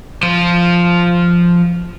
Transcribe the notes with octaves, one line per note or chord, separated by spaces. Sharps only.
F3 C5